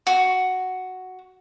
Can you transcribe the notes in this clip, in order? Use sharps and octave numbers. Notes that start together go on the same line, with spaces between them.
F#4